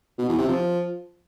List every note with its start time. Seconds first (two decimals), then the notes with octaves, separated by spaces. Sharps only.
0.18 B2
0.28 E2
0.38 C3
0.48 F3